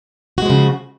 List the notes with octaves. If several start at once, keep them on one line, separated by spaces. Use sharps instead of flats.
C#3 F3 G#3 F#4